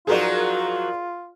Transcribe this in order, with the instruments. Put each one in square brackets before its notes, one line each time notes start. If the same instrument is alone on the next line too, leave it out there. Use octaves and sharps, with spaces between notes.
[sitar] F3 F#3 D#4 [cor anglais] F4 [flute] F#4 [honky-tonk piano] G#4 A#4 D5